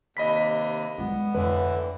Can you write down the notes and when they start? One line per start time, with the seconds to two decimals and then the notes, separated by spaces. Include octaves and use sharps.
0.17 D#2 C3 D#5 B5 B6
0.98 G3 G#3 B3
1.35 F2 A2 D3 E3 B4